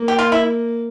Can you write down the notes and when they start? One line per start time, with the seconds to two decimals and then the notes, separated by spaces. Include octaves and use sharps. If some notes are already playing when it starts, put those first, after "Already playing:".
Already playing: A#3
0.08 G4
0.19 F4
0.32 E4